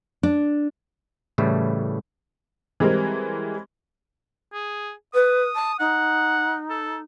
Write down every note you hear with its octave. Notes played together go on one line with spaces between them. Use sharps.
D4
A2 C#3 E3 G3 A3
E3 G3 G#3 C4 A#4
G#4
B4 D#6
A5
D#4 F#5
A4